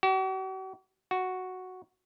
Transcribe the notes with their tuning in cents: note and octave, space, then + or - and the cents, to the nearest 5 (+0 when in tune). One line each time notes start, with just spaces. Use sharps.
F#4 +45
F#4 +0